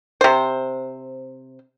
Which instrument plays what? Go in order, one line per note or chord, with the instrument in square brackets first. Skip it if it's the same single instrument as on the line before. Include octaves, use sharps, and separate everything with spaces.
[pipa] C3 C5